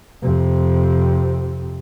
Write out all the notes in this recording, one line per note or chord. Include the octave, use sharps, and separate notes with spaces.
F2 C3